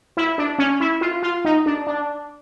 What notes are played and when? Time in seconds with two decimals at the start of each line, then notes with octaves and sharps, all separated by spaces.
0.17 E4
0.38 D4
0.59 C#4
0.80 E4
1.01 F4
1.23 F4
1.45 D#4
1.66 D4
1.87 D4